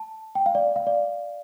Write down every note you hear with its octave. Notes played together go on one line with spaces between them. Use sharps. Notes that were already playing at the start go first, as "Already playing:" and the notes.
Already playing: A5
G5
F5
D5
F5
D5